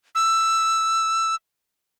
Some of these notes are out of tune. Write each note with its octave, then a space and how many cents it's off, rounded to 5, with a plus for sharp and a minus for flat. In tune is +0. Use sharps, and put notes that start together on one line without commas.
E6 +10